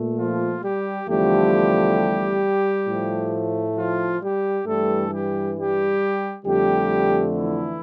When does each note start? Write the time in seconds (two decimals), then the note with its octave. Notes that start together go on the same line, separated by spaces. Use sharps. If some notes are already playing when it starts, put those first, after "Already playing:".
Already playing: A#2 A3
0.18 F3 F4
0.63 G3 G4
1.07 E2 D3 F3 G3 A3 G4
2.87 A2 F3 A3
3.77 F3 F4
4.21 G3 G4
4.66 G2 E3 G3 A3 A4
5.11 G3 G4
5.56 G3 G4
6.46 F2 D3 G3 A3 G4
7.36 E3 E4